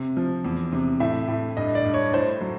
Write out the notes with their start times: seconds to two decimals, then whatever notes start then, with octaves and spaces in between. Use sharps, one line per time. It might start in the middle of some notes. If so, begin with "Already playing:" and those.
Already playing: C3
0.17 F3
0.45 E2
0.73 C3
1.00 A2 E5
1.28 A2
1.57 G2 D#5
1.75 D5
1.85 G2
1.94 C#5
2.13 A2 C5
2.41 F#3